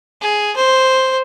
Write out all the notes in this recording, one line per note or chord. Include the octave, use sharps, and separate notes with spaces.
G#4
C5